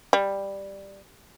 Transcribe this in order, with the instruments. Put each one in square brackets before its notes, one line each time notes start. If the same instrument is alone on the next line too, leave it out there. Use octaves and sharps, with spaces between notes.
[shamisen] G3